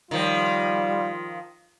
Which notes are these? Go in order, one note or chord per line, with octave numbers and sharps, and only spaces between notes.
D#3 F3 G3 F4